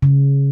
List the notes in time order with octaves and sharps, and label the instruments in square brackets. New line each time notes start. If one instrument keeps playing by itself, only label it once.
[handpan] C#3